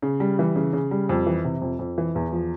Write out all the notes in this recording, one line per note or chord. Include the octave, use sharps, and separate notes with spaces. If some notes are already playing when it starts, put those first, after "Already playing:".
C#3
G3
E3
C#3
C#3
G3
F2
E3
C3
F2
F2
E3
E2
F3